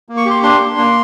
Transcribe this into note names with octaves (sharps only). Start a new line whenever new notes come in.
A#3
C#6
G4 C6
D4 C6
A#3
A#3